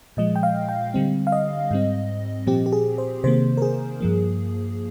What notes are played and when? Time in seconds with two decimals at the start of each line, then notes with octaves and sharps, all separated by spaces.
0.17 A#2 F3 G#3 D#5
0.36 G5
0.43 F5
0.69 G5
0.94 D3 G3 C4
1.27 F5
1.32 D#5
1.71 G#2 G3 C4
2.47 A#2 F3 C4 G4
2.66 G4
2.73 G#4
2.98 C5
3.24 C3 D#3 A#3 C5
3.57 A#4
3.62 G#4
4.01 G2 F3 A#3